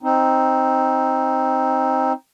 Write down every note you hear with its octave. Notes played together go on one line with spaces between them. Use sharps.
C4 D#4